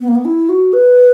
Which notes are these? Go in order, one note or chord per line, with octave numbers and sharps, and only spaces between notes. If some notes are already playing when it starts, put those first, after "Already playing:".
B3
A#3
B3
E4
F#4
B4